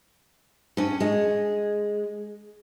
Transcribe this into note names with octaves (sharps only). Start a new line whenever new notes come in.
G2 C#4
G#3